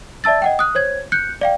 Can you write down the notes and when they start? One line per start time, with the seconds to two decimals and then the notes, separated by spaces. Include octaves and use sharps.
0.24 D5 E5 A5 E6 A6
0.42 D#5 F#5 G5
0.59 D#6 F#6
0.75 C5 C#5 G#6
1.12 F#6 G6 C#7
1.41 D5 F5 G5